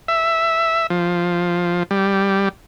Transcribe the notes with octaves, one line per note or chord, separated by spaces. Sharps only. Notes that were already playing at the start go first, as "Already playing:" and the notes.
E5
F3
G3